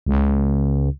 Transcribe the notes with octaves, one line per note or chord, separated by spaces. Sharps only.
C#2